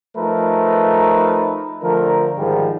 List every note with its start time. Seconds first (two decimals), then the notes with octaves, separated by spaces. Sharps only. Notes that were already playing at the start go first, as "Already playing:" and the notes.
0.16 F3 A3 D#4 A#4 B4
1.82 D3 F3 A3 A#4
2.36 G#2 D#3 F3 G3 G#3